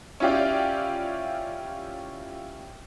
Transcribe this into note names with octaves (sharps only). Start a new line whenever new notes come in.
C#4 E4 F4 G4 D5